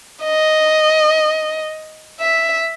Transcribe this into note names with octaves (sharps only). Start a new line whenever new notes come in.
D#5
E5